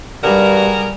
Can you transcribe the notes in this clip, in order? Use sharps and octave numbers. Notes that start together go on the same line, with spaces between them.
G2 G3 F#4 G#4 A#4